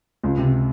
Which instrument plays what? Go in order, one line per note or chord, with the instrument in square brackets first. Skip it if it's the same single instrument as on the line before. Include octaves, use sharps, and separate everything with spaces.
[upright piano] C#2
C3